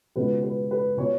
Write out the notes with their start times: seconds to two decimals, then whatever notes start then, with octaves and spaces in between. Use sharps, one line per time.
0.16 C#2 B2 B4
0.43 B4
0.71 B4
0.97 B2 C#5